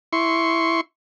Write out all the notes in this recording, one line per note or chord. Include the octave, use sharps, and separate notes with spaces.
E4 C6 C#6